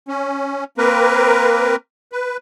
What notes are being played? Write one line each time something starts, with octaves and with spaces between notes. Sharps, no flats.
C#4
A#3 C4 A#4 B4
B4